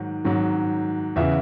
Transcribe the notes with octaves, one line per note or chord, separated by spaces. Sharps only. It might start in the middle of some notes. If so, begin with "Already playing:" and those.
Already playing: G#2 D#3 F#3
G#2 D#3 F#3
E2 C#3 E3 E5